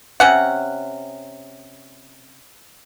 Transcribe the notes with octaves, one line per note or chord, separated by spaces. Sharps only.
C3 C#4 F#5